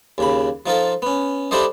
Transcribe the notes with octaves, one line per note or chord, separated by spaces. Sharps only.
D#2 C#3 B5
F3 D#4 F4 A4
B3 C#4
D4 E4 G4 A4 C5 D#5